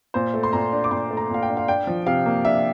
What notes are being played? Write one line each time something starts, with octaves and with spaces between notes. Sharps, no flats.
A#2 C5
A3
C6
A#2 A#5
D4
D6
A#2 C6
A3
A#5
A#2 F5
G5
D4
F5
D4 G5
F3
C3 F5
A#3
D4 E5